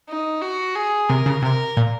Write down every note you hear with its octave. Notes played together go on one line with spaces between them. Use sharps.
D#4
F#4
G#4
C3 A#4
C#3
C3 A#4
A#2